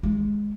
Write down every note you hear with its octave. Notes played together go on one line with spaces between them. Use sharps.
G#3